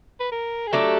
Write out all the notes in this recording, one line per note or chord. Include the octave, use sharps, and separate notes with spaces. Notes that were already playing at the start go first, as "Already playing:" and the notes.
B4
A#4
G#4
F#3 A3 D4 G4 A4